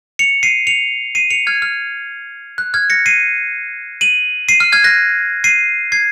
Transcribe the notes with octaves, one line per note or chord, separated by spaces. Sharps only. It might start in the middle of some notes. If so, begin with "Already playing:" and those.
C#7 F7
C7 D#7
C#7 F7
C7 D#7
C#7 F7
F6 G#6
F6
F#6
F6 G#6
A#6 C#7
C7 D#7
D#7 F#7
C7 D#7
F6
F6 G#6
F#6 A#6
C7 D#7
G#6 C7